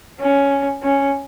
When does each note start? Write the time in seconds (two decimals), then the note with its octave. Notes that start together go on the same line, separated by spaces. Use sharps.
0.20 C#4
0.83 C#4